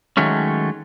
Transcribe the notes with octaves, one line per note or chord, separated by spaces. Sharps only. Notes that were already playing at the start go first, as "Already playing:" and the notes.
D#3 F#3 G#3 A3 C#4